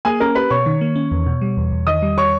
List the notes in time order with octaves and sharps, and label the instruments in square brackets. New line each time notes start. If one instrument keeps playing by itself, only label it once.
[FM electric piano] A#3 [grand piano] G#4 G#5
[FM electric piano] C#4 [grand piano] A#4 A#5
[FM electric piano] G4 [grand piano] B4 B5
[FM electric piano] B2 [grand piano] C#5 C#6
[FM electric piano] D#3
A#3
C#4
E2
B2
G3
E2
E2
[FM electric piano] D#3 [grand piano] D#5 D#6
[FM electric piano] G3
[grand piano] C#5 C#6